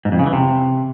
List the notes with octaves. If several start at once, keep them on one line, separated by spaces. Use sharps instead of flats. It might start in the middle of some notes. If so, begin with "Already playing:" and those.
G#2
F2
C#3
E3
C3